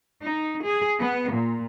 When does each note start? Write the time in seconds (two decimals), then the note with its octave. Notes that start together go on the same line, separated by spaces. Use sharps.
0.21 D#4
0.64 G#4
1.00 B3
1.33 A#2